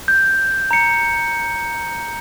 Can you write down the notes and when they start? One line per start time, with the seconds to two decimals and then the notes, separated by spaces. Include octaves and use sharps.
0.08 G6
0.71 A#5 C#7